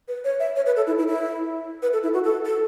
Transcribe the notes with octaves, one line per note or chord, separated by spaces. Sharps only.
B4
C#5
E5
C#5
B4
A4
E4
E4
E4
B4
A4
E4
F#4
A4
A4